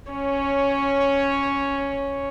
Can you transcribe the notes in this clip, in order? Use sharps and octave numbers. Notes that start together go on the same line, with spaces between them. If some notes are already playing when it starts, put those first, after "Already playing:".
C#4 C#5